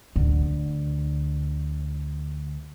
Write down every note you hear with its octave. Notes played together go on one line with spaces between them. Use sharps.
D2 D3